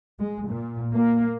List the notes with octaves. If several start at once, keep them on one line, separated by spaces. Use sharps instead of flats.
G#3
A#2
A#3